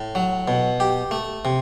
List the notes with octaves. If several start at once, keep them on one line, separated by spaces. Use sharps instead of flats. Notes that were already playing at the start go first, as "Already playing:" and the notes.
Already playing: A2
F#3
B2
G4
A3
C3